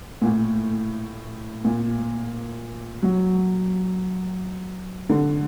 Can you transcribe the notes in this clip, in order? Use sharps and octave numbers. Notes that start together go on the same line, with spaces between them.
A#2
A2
A#2
F#3
D3